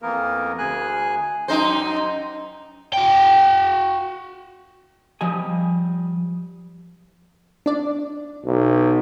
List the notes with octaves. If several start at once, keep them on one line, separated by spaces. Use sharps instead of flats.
F2 E3 A#3 B3 A#4
D2 G#4 G#5 F#6
F#2 D#4 C5
F#4 G5
F3 G3 D#5 G#5
D4 D5
B1